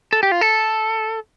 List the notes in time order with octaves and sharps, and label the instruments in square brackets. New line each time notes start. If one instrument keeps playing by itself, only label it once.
[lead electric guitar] A4
G4
F4
A4